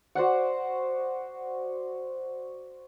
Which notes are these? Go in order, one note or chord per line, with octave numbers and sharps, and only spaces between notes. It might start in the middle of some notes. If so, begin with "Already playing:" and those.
F#4 C5 D5 F#5